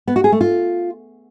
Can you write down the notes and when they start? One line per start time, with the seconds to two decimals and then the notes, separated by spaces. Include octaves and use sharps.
0.07 B3
0.16 F#4
0.24 G#4
0.32 A3
0.41 F4